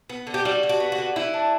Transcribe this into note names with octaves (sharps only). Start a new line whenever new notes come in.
B3
D3
G4
G3 F#4
D3
F#4
B3
F#4
D3
E3 E4
D4